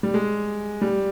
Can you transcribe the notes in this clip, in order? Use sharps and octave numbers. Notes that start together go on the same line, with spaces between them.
G3
G#3
G3